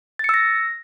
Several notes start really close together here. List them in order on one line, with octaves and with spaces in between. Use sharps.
A6 C#7 E6 A#6